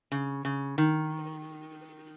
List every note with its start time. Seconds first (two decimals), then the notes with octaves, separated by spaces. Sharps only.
0.12 C#3
0.45 C#3
0.78 D#3